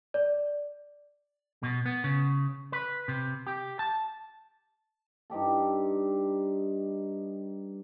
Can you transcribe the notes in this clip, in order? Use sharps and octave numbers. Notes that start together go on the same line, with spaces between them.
D5
B2
B3
C#3
B4
C3
G4
A5
G2 D#4 G4 A4